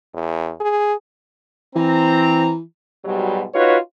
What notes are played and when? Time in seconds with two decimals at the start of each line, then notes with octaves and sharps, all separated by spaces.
0.14 E2
0.60 G#4
1.76 E3 C4 A#5
3.05 G#2 B2 F#3 G3
3.54 D#4 F4 F#4 B4 C#5